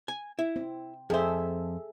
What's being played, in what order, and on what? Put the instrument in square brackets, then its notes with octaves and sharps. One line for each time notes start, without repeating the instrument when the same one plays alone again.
[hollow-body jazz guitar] G#5
E4
[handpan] C4
[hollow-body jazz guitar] F2 C5 [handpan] G#4 A4 E5